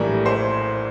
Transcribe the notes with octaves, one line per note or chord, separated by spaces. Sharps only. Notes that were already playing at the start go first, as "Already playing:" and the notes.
Already playing: A#1 A2 E3 G3 A#4
C5